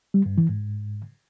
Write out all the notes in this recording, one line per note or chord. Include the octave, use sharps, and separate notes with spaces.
G3
G2
E3
G#2